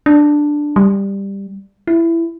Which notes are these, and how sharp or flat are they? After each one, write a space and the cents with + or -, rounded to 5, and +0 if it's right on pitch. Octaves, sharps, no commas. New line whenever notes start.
D4 +5
G3 +10
E4 +15